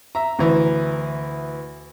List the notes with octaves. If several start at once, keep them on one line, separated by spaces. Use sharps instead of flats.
E5 A#5
D2 E3